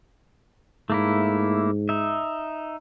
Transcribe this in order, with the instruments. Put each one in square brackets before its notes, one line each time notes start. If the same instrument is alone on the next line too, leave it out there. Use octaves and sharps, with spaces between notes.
[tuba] G#2 [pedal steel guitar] A3 A#3 E4
[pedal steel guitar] D#4 E5